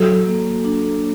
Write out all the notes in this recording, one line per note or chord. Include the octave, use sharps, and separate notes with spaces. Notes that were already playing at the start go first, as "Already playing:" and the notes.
Already playing: F#3 A4
A#3
D4